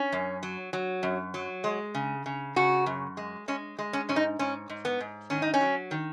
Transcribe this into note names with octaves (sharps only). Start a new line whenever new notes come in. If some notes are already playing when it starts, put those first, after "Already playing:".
Already playing: C#4
F#2
F#3
F#3
F#2
F#3
G#3
C#3
C#3
C#3 F#4
F#2
G#3
G#3 C#4
G#3
C#4
G#2 C#4
D#4
G#2 C#4
G#2
B3
G#2
D#3 C#4
D#4
C#4
F#3
D#3